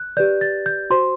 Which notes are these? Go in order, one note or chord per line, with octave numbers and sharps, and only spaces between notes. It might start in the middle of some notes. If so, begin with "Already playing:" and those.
Already playing: F#6
G4 B4 D5 G6
A6
G6
F#4 C5 C6